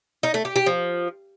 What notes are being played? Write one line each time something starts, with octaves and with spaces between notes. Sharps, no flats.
D#4
A3
G4
G4
F3